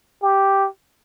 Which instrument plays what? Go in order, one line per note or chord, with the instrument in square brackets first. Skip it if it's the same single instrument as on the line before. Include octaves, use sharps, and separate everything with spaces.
[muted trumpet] G4